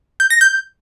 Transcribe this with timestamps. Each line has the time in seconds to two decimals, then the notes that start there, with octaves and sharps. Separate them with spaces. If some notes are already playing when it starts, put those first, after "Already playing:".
0.20 G6
0.30 A#6
0.41 G6